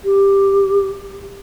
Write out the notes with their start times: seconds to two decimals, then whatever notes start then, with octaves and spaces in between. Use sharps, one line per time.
0.05 G4